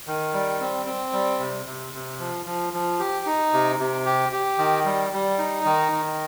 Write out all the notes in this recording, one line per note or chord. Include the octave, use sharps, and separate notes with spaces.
D#3
G3
C4
C4
G3
C3
C3
C3
F3
F3
F3
G4
D#4
C3
C3
G4
G4
D#3
G3
G3
D#4
D#3
D#3